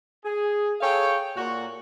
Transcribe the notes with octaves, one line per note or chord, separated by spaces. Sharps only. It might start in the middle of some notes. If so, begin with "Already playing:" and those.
G#4
G#4 A4 C#5 F5 G5
A#2 F#4